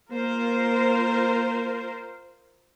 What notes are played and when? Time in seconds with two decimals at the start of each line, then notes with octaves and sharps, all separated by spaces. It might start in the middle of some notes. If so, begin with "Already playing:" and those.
0.11 A#3 F4 A#4 C5